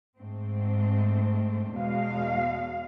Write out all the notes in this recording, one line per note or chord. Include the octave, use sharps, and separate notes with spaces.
G#2 A3 C4
E2 B2 G#3 F5